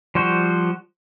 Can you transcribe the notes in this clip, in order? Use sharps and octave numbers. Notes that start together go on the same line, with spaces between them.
F3 G3 F#4 C5